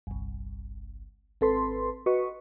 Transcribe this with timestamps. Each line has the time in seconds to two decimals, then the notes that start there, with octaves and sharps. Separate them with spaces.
0.07 G1 C2
1.41 G#1 C4 A4 B4 C6
2.06 F#4 B4 D#5 C#6